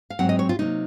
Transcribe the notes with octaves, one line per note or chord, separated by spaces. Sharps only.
F5
G#2 F#3 C4 F#5
D#5
C#5
F4
C3 F#3 A#3 D#4